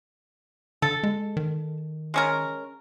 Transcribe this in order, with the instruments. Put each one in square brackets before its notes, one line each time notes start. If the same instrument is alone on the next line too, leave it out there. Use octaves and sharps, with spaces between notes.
[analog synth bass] D3 [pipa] A4
[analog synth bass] G#3
D#3
[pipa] G#3 C#4 A#4